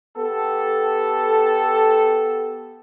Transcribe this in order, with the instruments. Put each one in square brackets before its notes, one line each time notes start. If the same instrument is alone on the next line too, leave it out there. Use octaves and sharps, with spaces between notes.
[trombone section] B3 G4 A4